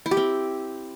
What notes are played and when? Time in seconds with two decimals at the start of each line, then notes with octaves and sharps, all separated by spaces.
0.06 E4
0.11 G4
0.17 C4